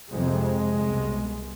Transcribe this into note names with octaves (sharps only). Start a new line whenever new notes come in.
F2 C3 G#3
C2 B2